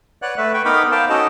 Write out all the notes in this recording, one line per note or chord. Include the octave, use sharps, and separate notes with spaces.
B4 C#5 D5 F#5 F#6
A3 B4 E5
B4 G5 B5 C#6
B3 D#4 A#4 G5 B5 D6
C5 F5 G5 A5 D6
C#4 D#4 F#4 A4 D#5 A5